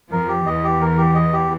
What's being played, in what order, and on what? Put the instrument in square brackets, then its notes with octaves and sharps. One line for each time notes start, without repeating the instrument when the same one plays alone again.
[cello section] F2 F3 [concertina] A#4
[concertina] G4
[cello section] E2 E3 [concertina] D#5
[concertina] G4
A#4
G4
D#5
G4